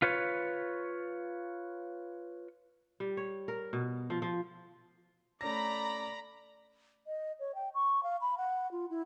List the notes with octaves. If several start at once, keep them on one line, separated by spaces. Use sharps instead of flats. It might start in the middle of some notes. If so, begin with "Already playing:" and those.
F4 B4 C#5
G3
C#5
A#4
B2
F3
F3
A3 C#4 D5 A#5 B5 A#6
D#5
C#5
G5
C#6
F5
B5
F#5
F4
E4